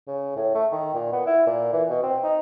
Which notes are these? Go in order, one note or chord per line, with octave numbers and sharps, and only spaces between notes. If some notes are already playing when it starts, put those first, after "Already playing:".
C#3
A2
A3
D#3
A#2
B3
E4
A#2
E3
B2
C4
D#4